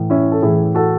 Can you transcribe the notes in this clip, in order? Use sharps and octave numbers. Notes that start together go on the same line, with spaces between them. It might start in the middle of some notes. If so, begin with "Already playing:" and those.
Already playing: A2 E3
C#4 E4
A4
A2 E3 E4 G#4
F#4 A4